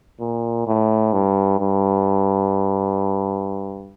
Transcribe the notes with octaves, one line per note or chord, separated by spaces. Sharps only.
A#2
A2
G2
G2